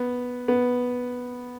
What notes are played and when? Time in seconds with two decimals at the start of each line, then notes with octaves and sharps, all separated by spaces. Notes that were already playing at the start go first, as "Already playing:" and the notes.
Already playing: B3
0.48 B3